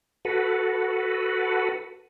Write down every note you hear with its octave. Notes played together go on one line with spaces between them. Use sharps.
F#4 A4 B4